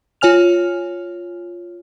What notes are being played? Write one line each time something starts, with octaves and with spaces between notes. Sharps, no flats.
F4 C#5 G#5 F6 F7